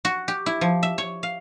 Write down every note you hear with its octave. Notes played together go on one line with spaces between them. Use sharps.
F#4
G4
E4
F3
E5
C#5
F5